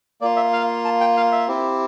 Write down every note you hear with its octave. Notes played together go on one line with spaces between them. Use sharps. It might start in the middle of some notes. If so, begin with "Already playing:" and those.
A#3 F4 D5
E5
F5
A5
G5
F5
E5
C4 E4 G4